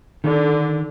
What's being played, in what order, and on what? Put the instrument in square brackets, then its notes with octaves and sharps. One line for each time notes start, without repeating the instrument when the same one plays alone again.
[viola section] D3 [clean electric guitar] D#3